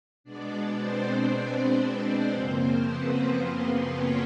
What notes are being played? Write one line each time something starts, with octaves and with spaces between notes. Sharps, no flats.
B2 G#3 B3 D4 D5
C4 C5
C4 C5
C4 C5
F#2 C#3 F3 A#3
B3 B4
C4 C5
C#4 C#5